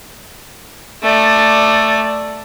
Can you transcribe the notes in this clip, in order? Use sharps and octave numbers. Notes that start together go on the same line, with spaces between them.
A3 D5